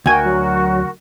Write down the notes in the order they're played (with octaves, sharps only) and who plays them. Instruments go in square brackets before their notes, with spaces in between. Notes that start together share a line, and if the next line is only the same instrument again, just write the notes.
[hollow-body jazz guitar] D2 G#5 [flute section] F#4 A#4 [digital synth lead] G5
[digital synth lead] F#3